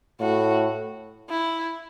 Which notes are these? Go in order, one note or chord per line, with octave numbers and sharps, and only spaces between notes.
A2 F#4
E4